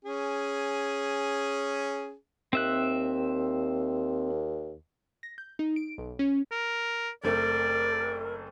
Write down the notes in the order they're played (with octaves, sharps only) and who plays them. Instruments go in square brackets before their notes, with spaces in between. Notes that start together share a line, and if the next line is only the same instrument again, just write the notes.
[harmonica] C#4 G#4
[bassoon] D#2 [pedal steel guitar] C4 E5 F#6
[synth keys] A#6
G6
D#4
D7
B1
C#4
[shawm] A#4
[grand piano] F#1 A3 C4 [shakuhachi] A#4 [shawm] D5